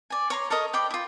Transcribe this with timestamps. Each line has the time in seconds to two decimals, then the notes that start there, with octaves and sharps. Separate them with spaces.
0.10 D5 G#5
0.30 C#5 A#5 C6
0.50 A4 A#4 C#5 D#5
0.73 C5 D5 G5 B5
0.90 E4 F4